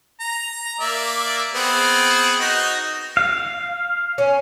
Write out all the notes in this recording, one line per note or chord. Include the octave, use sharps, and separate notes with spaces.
A#5
A#3 D5 E5
B3 C4 G#4
D#4 F#4
F5
C#4